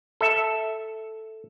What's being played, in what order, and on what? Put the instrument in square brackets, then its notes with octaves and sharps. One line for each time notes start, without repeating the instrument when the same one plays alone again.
[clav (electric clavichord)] A4 E5